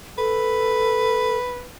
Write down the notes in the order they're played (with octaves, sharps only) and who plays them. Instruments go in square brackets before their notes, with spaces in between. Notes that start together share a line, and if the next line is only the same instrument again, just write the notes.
[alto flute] A4 [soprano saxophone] B4